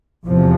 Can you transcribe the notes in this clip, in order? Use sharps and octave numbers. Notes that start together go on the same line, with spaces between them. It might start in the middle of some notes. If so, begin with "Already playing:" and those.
E2 C3 F3